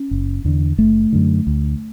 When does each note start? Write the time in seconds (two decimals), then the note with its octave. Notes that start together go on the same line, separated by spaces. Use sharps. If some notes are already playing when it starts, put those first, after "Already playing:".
Already playing: C#4
0.11 F#1
0.44 E2 D3
0.78 F#1 A3
1.12 F#2 D3
1.47 D2